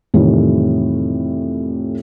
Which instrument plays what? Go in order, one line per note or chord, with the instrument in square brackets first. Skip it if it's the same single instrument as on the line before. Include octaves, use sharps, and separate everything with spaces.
[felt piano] F2 A2 C3 D#3 E3 G3